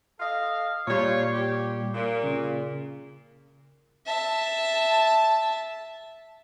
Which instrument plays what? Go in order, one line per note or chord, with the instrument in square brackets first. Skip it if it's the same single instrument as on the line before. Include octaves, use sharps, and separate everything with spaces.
[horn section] A4 D#5 F5
[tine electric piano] A#2 G3 [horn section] F4 C#5
[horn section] G4
A#2
[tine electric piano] C#3
[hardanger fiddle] E5 A5